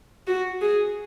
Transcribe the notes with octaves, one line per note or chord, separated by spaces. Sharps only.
F#4
G#4